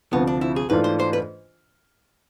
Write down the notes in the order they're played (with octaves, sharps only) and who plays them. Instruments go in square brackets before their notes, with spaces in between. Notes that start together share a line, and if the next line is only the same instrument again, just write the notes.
[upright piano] D2 C3 F3 [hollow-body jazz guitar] B3
[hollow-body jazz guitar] D4
E4
G#4
[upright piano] G#2 E3 A3 D4 F4 [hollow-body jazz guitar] B4
[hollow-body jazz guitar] C5
C5
B4